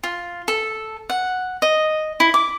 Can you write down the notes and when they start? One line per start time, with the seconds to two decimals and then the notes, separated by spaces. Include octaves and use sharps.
0.03 F4
0.48 A4
1.10 F#5
1.62 D#5
2.20 E4
2.34 D6